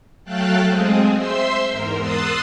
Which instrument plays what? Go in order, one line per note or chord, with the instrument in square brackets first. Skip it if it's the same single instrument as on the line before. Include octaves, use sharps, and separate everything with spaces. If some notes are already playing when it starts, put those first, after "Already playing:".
[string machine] F#3 A3 F5 G5 A5 F#6
G#3 C4 G#4
C5 E5 C6 E6
E2 G#2 A#4
C6 D#6 E6 F#6 A6 C7